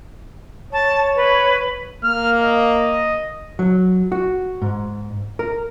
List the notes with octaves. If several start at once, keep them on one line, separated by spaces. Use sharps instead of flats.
C#5 A5
B4
A#3 F6
D#5
F#3
F#4
G#2
A#4